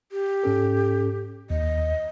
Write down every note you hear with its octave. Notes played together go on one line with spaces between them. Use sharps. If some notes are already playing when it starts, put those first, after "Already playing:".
G4
G#2 C#4 A4
D#2 D#5